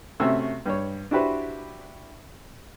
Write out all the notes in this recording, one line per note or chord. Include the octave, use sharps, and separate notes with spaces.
C3 A3 C#4 F#4 E6
G2 C#5
D4 E4 F#4 G4 B4 C5